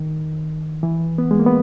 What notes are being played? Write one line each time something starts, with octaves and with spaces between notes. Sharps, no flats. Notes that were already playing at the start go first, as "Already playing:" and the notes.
Already playing: D#3
E3
B3
G#3
A#3
B3